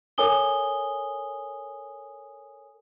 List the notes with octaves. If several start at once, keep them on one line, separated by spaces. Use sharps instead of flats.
A4 A#4 C#5 G#5 D#6 G7